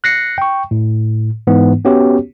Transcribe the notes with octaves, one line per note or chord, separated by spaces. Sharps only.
F#6 A#6 C7 C#7
G5 C#6
A2
G#2 E3 B3
B3 C#4 F#4 G4 C#5